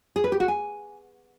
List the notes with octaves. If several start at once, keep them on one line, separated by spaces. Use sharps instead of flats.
G#4
B4
G4
F#4
G#5